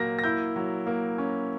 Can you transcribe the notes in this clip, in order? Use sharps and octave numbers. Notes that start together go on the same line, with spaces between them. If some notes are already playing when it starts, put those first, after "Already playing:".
Already playing: A#2 F#3 A#3 A#6
A#6
E4 G6
F#3
A#3
C#4